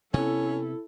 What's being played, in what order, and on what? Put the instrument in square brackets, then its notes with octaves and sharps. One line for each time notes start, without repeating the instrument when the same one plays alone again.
[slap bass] C3 B3 [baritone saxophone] C#4 [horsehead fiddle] E4 A4